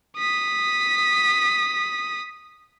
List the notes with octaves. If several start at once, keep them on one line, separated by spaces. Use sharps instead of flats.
D#6 B6